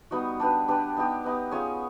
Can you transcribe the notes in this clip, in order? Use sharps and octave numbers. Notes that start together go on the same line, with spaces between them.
G3 B3 D#4 F#4
D4 G4 B4
D4 G4 B4
B3 D#4 G4
B3 D#4 G4
C#4 F4 G#4 C#5